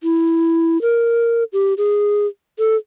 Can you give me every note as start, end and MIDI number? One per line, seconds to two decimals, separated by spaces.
0.03 0.81 64
0.82 1.44 70
1.53 1.74 67
1.78 2.26 68
2.59 2.76 69